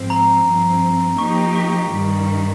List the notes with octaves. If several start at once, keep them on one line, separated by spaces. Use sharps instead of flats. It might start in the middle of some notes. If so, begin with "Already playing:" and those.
Already playing: G#2 F3 C4
A#5
G2 F3 C4
F3 A#3 D#4 G4 C#6
C#6
G2 D#3 G3